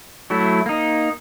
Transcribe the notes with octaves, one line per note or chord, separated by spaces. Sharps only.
F#3 A3 E4
A#3 D#4